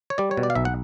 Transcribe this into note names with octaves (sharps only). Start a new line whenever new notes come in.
C#5
G3 D5
C#5
B2
D5
F5
B1 E5
F#5